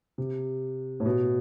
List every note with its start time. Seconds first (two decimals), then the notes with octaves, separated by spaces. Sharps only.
0.18 C3
1.00 A2
1.06 B2